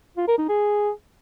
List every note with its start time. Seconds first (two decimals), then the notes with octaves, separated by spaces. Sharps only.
0.17 F4
0.28 A#4
0.38 D#4
0.49 G#4